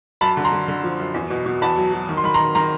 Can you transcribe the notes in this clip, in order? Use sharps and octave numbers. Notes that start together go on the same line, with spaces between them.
F#2 A5 B5
D3
A#5 C6
D3
D3
F3
F#2
E2
B2
B2
E2 A5 B5
F#3
F#3
D#3
C6
D#3 B5
A#5 C6
D#3
D#3 A#5 C6